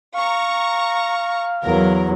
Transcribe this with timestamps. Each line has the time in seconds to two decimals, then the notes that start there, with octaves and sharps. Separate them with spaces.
0.15 F5 A#5 C#6
1.64 E2 F#3 A#4